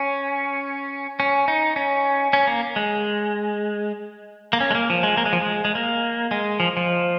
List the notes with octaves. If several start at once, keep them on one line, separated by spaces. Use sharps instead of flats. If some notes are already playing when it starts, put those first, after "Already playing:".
Already playing: C#4
C#4
D#4
C#4
C#4
A#3
G#3
A#3
C#4
G#3
A#3
F3
G#3
A#3
G#3
F3
G#3
G#3
A#3
G#3
F3
F3